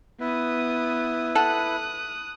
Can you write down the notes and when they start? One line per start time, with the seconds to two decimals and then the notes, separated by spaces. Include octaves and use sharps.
0.20 B3 E4 B4 D#6
1.35 A4 F#5 D#6 F#6